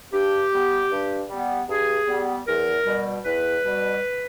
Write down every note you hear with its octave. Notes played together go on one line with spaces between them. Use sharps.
G2 G4
G3 B3
G2
G3 B3
G2 G#4
G3 B3
E2 A#4
B2 G3
E2 B4
B2 G3